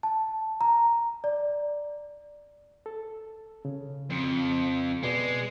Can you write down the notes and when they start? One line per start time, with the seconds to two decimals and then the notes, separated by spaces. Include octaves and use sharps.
0.03 A5
0.61 A#5
1.24 D5
2.86 A4
3.65 C#3
4.10 F2
5.03 B2 G#3 B4 D5